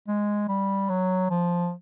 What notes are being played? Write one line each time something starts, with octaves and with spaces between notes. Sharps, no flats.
G#3
G3
F#3
F3